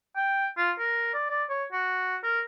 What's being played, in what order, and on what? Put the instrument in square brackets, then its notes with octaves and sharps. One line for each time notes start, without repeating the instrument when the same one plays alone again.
[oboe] G5
F4
A#4
D5
D5
C#5
F#4
A#4